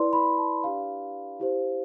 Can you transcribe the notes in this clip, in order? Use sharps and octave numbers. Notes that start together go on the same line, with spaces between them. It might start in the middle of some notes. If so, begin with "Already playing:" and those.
Already playing: E4 B4 D5 C6
B5
A5
D4 G4 B4 D5 F5
E4 G4 C5